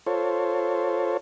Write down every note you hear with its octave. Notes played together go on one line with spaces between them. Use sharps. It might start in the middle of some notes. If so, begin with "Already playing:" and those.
F4 A4 C5 C#5